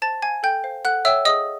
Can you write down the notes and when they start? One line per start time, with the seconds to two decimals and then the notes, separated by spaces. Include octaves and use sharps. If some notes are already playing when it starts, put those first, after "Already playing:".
0.02 C5 A5 A6
0.22 F5 G#5 G#6
0.43 A4 G5 G6
0.64 C5 F5
0.85 A4 F#5 F#6
1.05 C#5 E5 G5 E6
1.25 G#4 D#5 D#6